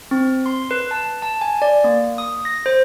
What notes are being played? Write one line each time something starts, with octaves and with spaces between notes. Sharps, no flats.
C4
C6
B4
A5
A5
G#5
D5
A#3
D#6
A#6
C5